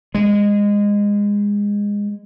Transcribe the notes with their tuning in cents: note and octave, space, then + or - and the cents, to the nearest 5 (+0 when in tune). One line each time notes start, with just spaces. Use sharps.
G#3 -20